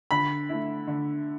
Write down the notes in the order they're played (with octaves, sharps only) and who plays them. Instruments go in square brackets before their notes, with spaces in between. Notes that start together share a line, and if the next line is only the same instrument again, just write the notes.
[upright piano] D3 [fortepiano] B5
[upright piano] A3 E4
D3